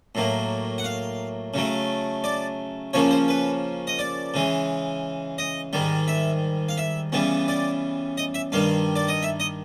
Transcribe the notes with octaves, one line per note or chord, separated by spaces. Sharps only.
A2 F#3 A#3
F#5
F5
C#3 F#3 A3
D5
C#3 F3 A#3 C#4 C#5
C5
B4
D#5
D5
C#3 E3 G#3
D#5
G#2 D#3 G3
E5
F5
E5
C#3 E3 G3 B3
D5
D#5
E5
G2 D#3 G3 F5
D5
D#5
E5
D#5